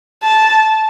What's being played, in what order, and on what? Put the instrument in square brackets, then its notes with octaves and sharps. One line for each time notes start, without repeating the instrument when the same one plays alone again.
[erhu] A5